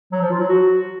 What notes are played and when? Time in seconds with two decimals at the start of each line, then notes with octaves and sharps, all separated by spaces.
0.12 F#3
0.21 F3
0.30 F4
0.39 F#3
0.49 F#4